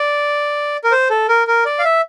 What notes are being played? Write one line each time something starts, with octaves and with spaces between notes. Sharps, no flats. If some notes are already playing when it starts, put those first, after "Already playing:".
Already playing: D5
A#4
C5
A4
A#4
A#4
D5
F5
E5